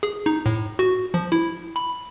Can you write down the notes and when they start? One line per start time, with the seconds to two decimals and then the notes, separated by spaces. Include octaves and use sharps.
0.03 G#4
0.26 D#4
0.46 A2
0.79 F#4
1.14 F3
1.32 E4
1.76 B5